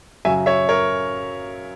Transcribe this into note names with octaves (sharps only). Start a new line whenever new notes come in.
F#2 C#3 F#3 E5 G#5
C#5 E5
A#4 C#5